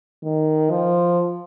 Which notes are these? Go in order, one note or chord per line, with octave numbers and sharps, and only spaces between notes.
D#3
F3